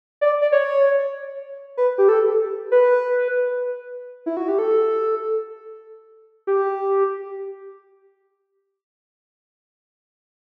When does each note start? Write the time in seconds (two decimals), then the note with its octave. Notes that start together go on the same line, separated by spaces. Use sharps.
0.21 D5
0.41 D5
0.52 C#5
1.77 B4
1.98 G4
2.09 A4
2.72 B4
4.26 E4
4.37 F#4
4.48 G4
4.59 A4
6.47 G4